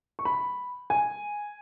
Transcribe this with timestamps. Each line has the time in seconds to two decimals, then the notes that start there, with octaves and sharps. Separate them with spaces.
0.19 C#6
0.25 B5
0.90 G#5